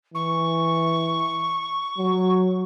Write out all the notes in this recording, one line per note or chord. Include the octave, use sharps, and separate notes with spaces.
E3 C#6
F#3